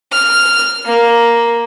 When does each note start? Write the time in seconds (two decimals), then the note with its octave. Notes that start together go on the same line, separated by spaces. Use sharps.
0.12 F6
0.85 A#3